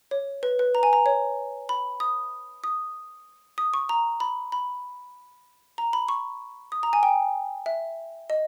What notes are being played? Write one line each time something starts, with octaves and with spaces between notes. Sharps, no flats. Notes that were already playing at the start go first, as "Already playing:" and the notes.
C#5
B4
B4
A#5
G#5
A#5
C#5
B5
D#6
D#6
D#6
C#6
A#5
B5
B5
A#5
B5
C#6
D#6
A#5
G#5
G5
E5
D#5